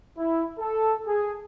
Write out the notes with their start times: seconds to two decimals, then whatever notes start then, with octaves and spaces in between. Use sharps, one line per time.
0.17 E4
0.57 A4
1.06 G#4